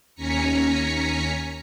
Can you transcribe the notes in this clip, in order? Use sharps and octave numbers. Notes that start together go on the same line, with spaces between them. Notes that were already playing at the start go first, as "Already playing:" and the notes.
D#2 C#4 G#5 A#5 B6 C#7